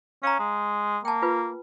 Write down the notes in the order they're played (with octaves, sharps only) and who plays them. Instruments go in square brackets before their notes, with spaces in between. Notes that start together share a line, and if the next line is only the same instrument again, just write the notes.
[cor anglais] C#4 [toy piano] F5 A#5
[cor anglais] G#3
[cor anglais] A#3 [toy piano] G5 A5
[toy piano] F4 B4